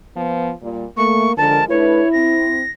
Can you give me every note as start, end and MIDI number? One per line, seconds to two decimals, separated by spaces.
0.15 0.51 53
0.15 0.51 59
0.62 0.84 46
0.62 0.84 55
0.97 1.27 57
0.97 1.37 58
0.97 1.32 85
1.37 1.59 50
1.37 1.63 53
1.37 1.63 56
1.37 1.63 70
1.37 1.65 81
1.70 2.02 57
1.70 2.02 62
1.70 2.67 64
1.70 2.02 71
1.70 2.11 73
2.13 2.62 60
2.13 2.70 94